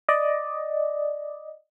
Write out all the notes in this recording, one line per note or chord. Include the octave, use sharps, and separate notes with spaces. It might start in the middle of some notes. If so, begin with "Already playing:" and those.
D5 D#5